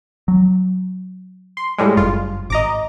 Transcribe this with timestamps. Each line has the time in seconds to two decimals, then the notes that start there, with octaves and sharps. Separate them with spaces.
0.28 F#3
1.57 C6
1.78 A2 G3 G#3
1.97 F#1 G2 F4
2.50 G#1 D#5 A#5 D6